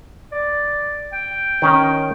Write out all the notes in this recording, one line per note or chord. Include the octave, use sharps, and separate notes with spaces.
D5
G5
D#3 C#4 D#4